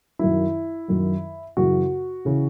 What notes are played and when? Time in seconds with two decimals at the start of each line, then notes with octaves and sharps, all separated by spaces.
0.19 F#2 D#3 F#3 E4
0.88 F#2 D#3 F#3
1.57 F#2 C#3 E3 F#4
2.25 C#3 E3